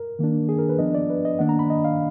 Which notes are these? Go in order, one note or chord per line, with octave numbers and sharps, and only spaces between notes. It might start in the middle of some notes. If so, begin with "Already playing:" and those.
Already playing: A#4
D#3 A#3 D4
G#4
A#4
B4
F3 B3 D4 D#5
D5
B4
D#5
D#3 A#3 D4 F#5
A#5
B5
D#5
F5